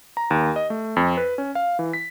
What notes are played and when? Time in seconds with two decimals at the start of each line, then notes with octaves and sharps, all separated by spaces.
0.17 A#5
0.31 D#2
0.56 D#5
0.70 A3
0.96 F2
1.17 B4
1.38 C#4
1.55 F5
1.79 E3
1.93 B6